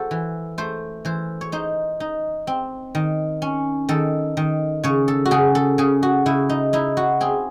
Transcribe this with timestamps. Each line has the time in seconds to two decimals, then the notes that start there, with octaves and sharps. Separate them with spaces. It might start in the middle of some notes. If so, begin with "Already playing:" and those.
Already playing: F#4 A4 C5
0.11 E3
0.58 A3 C5
1.05 E3 C5
1.41 C#5
1.52 D#4 C5
2.00 D#4
2.47 C4
2.95 D#3
3.42 C#4
3.89 D#3 A4
4.37 D#3
4.84 C#3 C#5
5.08 A4
5.25 F#4
5.31 C#3 G#4
5.55 A4
5.78 C#3 G#4
6.03 F#4
6.26 C#3 E4
6.49 D#4
6.73 D#4 E4
6.97 F#4
7.21 C4 G#4